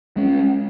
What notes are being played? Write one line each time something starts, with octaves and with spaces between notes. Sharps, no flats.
G#3 C#4